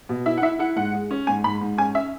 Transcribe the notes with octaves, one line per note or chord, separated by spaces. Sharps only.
B2
E4 E5
F#5
E4 E5
E4 F#5
G#2 F#5
G#3
C#4
G#2 G#5
G#2 B5
G#2
C#4 G#5
C#4 E5